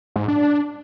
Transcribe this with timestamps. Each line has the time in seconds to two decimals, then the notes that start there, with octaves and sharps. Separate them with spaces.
0.16 G#2
0.28 D4